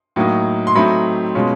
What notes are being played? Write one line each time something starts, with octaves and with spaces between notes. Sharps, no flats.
A2 F#3 A#3 D#4
C6
F#3 A3 C4 D#4 B5
B2 G#3 C#4 F4